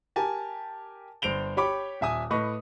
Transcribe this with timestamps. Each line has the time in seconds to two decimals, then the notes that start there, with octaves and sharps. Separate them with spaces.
0.16 G4 A#4 G#5 A5
1.22 G1 C5 D7 F7 G7
1.57 G4 C#5 G5 B5 D6
2.01 D#1 E5 G#5 D#6
2.30 A2 B4 D#5 C#6